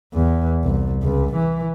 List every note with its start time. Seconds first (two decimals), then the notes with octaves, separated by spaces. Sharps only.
0.14 E2
0.64 C2
1.03 C#2
1.36 E3